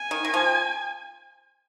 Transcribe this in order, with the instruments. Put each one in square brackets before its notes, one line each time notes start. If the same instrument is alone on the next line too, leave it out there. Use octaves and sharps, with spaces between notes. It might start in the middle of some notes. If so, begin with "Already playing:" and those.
Already playing: [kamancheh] G#5
[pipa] D#3
D#3
F3